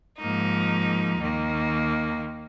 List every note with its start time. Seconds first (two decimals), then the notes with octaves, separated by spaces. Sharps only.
0.18 G#2 F3 A#3 D#4
1.19 D#2 D#3 A#3